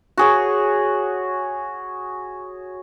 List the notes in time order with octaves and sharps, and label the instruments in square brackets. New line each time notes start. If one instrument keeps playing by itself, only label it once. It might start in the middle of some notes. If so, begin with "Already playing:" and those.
[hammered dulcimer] F#4 G#4 C#5